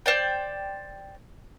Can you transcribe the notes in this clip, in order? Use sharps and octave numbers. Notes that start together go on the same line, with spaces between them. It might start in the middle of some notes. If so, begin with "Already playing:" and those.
C5 D5 G5